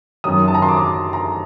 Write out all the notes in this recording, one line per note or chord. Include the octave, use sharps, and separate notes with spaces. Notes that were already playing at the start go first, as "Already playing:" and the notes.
F#2 D#3 F#3 D#6
A5
A#5
C6
D6
A#5